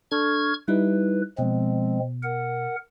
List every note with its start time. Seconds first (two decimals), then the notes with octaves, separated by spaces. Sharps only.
0.12 D4 A4 C#6 F6 G#6
0.68 G3 D#4 E4 B4
1.39 B2 F3 G#3 C4
2.23 A#4 F#5